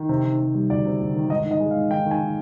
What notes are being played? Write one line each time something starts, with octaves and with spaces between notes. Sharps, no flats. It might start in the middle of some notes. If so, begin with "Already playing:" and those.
Already playing: D#3
C3
D#3
C3
G3
D2 D5
C3
D2
D#3
G#2 D#5
D#3
D#5
G#3
F5
G#2
D#3 G5
D#3
G#5
D#3